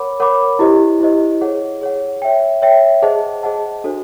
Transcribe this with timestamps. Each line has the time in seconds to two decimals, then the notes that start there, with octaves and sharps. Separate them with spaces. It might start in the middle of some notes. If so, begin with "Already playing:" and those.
Already playing: A#4 C#5 F#5 B5 D6
0.20 A#4 C#5 F#5 B5 D6
0.59 E4 G4 C5 D#5
1.00 E4 G4 C5 D#5
1.41 G#4 C#5 F#5
1.81 G#4 C#5 F#5
2.22 C#5 E5 G5
2.62 C#5 E5 G5
3.02 G#4 C5 D#5 F#5 A5
3.43 G#4 C5 D#5 F#5 A5
3.84 D4 F#4 A4 C5